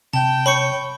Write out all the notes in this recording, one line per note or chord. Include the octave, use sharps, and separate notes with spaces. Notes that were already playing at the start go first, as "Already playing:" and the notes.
C3 G5 A5
C#5 B5 C#6 C#7